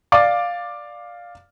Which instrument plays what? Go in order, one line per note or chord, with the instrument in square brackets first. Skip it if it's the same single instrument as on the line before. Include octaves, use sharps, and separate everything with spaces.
[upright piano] D5 F5 D6 A6